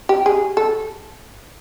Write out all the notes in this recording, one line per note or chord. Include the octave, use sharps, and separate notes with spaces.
G4
G#4
A4